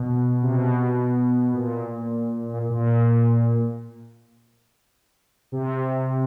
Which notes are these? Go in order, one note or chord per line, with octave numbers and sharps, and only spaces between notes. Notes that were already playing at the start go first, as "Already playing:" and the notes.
Already playing: B2
C3
B2
A#2
A#2
A#2
A#2
A#2
C3